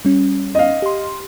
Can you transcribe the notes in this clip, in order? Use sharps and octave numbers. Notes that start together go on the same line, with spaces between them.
G3 C#4
D#5 F5
G4 C6